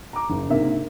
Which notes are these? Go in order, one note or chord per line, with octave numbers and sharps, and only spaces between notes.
A#5 D6
F#1
A#1 G#2 C3 A#3 E5